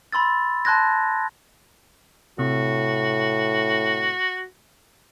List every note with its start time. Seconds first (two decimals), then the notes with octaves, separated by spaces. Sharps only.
0.12 B5 C6 E6 A6
0.65 A5 C6 F#6 G#6 A#6
2.39 A2 C3 F#4